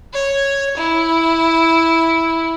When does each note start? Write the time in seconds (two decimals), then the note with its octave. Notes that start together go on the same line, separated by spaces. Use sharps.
0.13 C#5
0.77 E4